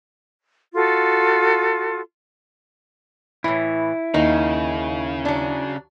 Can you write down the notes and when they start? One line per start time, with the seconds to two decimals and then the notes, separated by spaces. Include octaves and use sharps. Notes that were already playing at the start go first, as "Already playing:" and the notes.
0.75 F4 F#4 A4
3.44 A2 E3 E4
4.14 D#2 C#3 D#4
5.25 F#3 D4